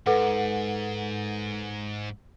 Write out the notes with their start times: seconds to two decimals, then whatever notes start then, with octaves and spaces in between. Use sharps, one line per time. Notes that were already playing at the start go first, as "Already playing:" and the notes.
0.06 G#2 A4 B4 F#5